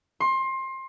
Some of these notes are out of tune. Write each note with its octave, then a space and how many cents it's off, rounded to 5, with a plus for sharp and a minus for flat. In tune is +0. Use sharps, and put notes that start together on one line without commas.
C6 +25